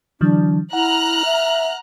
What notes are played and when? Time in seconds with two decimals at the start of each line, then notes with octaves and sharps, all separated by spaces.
0.21 D3 E3 F#3 D4
0.73 E4 F#5 A#5 F6 F#6
1.25 E5